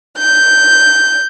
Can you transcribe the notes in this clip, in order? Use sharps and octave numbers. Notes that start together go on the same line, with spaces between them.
G6